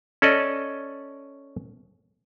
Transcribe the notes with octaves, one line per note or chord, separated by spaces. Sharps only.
C#4 A4 D5 D#5